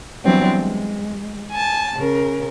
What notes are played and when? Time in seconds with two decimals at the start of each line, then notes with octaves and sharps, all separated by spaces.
0.24 E3 F#3 G3 B3 C4 D4
0.57 G#3
1.49 G#5 A5
1.96 C#3 A#4